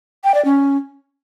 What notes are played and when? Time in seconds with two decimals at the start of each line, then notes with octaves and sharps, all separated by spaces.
0.24 G5
0.34 D5
0.45 C#4